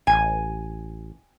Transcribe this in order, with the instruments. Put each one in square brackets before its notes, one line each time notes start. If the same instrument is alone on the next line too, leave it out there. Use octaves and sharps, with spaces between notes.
[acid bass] A1 [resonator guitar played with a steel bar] G#5